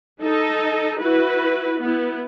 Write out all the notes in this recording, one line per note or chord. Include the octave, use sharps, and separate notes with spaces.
D#4 A4 D#5
E4 F#4 B4
B3 E4